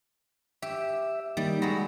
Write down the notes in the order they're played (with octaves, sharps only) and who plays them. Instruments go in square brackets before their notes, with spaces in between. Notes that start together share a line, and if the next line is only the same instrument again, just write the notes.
[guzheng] G4 [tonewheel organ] E5
[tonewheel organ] D#3 A#3 D#4 [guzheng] G3
[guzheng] F#3 G#3 [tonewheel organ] B5 A#6